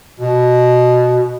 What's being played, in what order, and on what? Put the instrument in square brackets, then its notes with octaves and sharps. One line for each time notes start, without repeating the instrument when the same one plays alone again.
[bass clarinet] B2